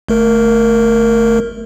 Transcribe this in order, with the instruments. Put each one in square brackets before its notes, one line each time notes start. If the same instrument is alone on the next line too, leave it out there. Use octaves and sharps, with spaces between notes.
[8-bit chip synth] G1 A3 A#4